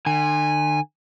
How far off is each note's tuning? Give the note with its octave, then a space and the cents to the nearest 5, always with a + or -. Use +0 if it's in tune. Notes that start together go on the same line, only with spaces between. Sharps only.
D3 +45 G#5 -15